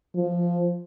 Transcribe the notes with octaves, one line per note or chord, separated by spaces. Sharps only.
F3